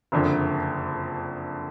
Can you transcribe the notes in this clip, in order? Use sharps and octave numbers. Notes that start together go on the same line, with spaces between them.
F#1 F2 D3